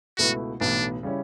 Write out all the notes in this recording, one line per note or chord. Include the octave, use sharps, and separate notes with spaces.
C#2 B2 A3 E4 F#4 B4
B1 A2 E3 B3 D4
C#3 G3 C#4 E4